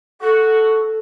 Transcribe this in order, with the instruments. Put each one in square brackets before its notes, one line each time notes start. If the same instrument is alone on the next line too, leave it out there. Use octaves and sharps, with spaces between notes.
[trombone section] F#4 [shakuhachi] A4